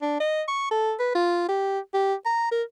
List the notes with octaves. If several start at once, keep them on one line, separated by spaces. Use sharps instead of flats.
D4
D#5
C#6
A4
B4
F4
G4
G4
A#5
A#4